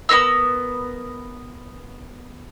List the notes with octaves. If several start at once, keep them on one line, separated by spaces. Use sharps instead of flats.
B3 C#4 A#4 E6